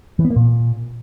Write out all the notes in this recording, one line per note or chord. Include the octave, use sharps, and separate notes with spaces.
E3
B3
A#3
A#2